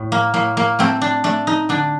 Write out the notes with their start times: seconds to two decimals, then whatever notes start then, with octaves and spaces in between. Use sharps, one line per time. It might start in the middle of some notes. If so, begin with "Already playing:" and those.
Already playing: A2
0.12 A#3
0.34 A2 A#3
0.57 A#3
0.79 A3 C4
1.02 D4
1.24 A3 D4
1.47 D#4
1.69 D3 D4